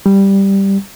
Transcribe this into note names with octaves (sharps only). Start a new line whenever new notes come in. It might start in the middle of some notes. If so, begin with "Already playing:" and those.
G3